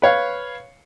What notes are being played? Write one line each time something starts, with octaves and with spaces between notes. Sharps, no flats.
B4 C#5 F5